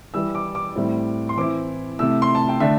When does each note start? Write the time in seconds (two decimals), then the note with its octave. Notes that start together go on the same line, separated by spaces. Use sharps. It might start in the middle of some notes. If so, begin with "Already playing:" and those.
0.14 E3 G3 E4 E6
0.35 D6
0.55 D6
0.76 A2 G3 C4 E4
1.29 C6
1.37 E3 C4 E4 D6
1.99 C3 A3 E4 E6
2.22 C6
2.35 A5
2.49 G5
2.60 D3 A3 D4 E5